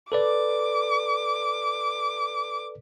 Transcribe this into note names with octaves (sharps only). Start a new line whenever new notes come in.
A4 B4 D5 D6